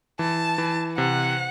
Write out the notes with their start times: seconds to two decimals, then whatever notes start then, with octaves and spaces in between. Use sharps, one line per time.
0.19 E3 A5
0.58 E3
0.98 C3 F#5